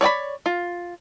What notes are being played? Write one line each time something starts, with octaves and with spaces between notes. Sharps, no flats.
C#5 D5 G5 B5
F4